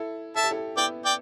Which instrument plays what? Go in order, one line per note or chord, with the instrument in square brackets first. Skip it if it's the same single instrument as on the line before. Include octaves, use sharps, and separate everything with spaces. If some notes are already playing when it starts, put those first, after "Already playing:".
Already playing: [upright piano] E4 A4
[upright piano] A4 [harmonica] E5 A5
[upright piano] G4
E4 A4
[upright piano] B3 E4 [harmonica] D5 G5
[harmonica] D5 G5